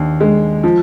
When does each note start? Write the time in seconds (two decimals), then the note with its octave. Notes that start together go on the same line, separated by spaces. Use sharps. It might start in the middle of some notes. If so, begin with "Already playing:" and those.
Already playing: D#2 D4
0.20 G#3
0.63 F3